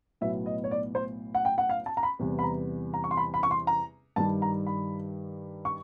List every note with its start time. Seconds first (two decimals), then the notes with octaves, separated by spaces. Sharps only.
0.21 B1 A2 F#3 B3 E5
0.46 D#5
0.64 C#5
0.71 D5
0.95 C5
1.35 F#5
1.45 G5
1.58 F#5
1.69 F5
1.86 A5
1.97 A#5
2.03 B5
2.19 E2 C3 E3 G3 B3
2.39 B5
2.43 A#5
2.94 A#5
3.04 C#6
3.11 C6
3.17 B5
3.34 B5
3.43 C#6
3.51 C6
3.67 A#5
4.16 G2 D#3 G3 A5
4.42 A#5
4.67 B5
5.65 C#6